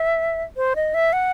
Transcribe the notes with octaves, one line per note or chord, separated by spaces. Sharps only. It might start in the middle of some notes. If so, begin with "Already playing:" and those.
Already playing: E5
C5
D#5
E5
F#5